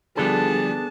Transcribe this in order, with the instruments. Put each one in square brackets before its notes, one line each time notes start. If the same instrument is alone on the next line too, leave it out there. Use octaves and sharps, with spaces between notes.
[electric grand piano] D3 F3 G3 [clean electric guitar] B3 D4 A4 [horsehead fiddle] G#4 A5